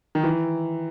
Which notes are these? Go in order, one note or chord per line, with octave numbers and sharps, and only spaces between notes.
D#3
E3